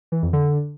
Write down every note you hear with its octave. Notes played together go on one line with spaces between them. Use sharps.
E3
F2
D3